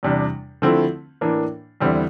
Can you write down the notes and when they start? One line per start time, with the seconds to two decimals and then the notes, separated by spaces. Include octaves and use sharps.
0.03 E2 C3 G3 D4
0.62 D3 F3 A3 C4 E4
1.21 A2 E3 A#3 D4
1.80 E2 D3 G3 C4 E4